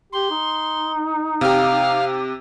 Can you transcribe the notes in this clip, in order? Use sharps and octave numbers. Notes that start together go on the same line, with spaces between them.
G4 C6
D#4
C3 G4 F5